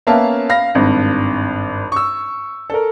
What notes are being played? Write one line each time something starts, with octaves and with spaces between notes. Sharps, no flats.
A#3 B3 C#4 E5 F5 A5
F5 B5 A#6
G#1 G2
C#6 E6
A4 A#4